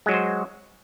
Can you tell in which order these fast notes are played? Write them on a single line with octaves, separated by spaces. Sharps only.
G#3 F#3 F#4 C5